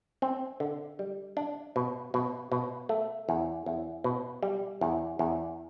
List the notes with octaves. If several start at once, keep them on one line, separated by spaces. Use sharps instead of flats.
C4
D3
G3
D4
B2
B2
B2
A3
E2
E2
B2
G3
E2
E2